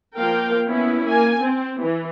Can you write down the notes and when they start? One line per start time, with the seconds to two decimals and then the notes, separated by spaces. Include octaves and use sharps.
0.16 F3 A#3 A#4 F5 G5
0.66 B3 C#4 E4
1.05 A#3 G#5
1.41 C4
1.81 E3